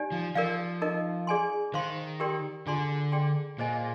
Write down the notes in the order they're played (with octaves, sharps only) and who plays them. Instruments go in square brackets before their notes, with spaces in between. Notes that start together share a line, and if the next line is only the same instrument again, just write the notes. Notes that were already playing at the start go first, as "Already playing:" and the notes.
Already playing: [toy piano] D#4 G4 D5 G#5
[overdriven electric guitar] F3
[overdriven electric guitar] F3 [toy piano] A#4 D5 F5
[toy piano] D#4 A#4 D#5
G#4 D5 G#5 C6
[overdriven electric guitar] D#3 [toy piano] C5 F5 C6
[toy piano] G4 A#4 D5 G5 C6
[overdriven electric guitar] D3 [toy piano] F4 G#4 D5 G#5 C6
[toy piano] G#4 D5 G5 C6
[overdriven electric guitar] A#2 [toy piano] G#4 C5 D#5 G#5